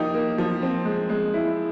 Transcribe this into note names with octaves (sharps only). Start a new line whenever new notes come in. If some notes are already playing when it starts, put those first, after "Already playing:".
Already playing: F3 A#3 D#4 G4
A#3
F3
C4
G#3
G#3
E4